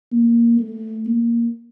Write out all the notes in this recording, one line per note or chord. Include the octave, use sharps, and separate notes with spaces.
A#3
A3
A#3